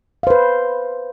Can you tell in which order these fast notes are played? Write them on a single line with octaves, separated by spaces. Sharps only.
F5 C5 B4